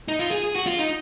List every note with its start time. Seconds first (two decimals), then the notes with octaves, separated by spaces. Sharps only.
0.08 D#4
0.19 F4
0.31 G#4
0.44 G#4
0.55 F#4
0.66 F4
0.79 D#4